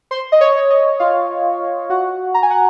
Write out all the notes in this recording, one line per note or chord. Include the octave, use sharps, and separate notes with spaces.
C5 C6
D#5
C#5
D#5
F4 F5
F#4 F#5
A#5
G#5
F#5